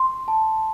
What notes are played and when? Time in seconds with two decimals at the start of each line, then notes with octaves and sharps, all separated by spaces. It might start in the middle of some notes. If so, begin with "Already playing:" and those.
Already playing: C6
0.28 A5